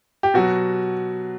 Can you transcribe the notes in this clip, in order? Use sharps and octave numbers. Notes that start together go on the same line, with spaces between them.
G4
B2 F#3 F#4